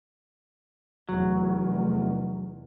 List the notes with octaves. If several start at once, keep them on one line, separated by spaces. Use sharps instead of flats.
F1 E2 F#3